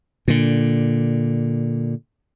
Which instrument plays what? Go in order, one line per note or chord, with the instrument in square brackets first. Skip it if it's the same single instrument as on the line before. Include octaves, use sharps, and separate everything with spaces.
[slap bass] A#2 D3